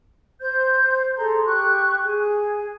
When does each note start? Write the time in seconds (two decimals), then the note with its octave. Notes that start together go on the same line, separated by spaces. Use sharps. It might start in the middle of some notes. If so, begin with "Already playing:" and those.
0.41 C5 G6
1.16 G#4 A4 A#5 C6
1.46 G4 C#6 F#6
2.04 G#4 G#5